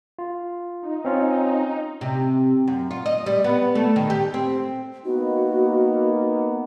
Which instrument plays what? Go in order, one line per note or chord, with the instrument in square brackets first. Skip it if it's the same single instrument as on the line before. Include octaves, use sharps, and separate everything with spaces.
[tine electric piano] F4
[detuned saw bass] D#4
[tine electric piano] C4 C#4 F4
[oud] C3
F#2
F4
D#5
G3
B3
A3
D#3
G4
C4
[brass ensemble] A#3 B3 D#4 [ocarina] F#4